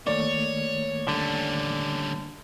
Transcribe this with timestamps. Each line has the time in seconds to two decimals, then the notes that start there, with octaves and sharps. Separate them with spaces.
0.07 D#3 A3 A#3 C#5 D5
1.08 D3 G3 C#4